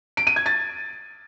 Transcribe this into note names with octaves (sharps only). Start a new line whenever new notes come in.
D7
D#7
G#6
A6